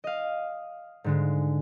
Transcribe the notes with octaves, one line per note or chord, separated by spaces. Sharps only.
D#5 F5
G#2 D3 G#3